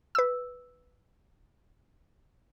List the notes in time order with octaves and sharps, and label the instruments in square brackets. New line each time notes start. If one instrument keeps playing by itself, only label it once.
[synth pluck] B4 E6